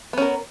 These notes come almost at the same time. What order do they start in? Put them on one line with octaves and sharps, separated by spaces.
B3 C#4 A#4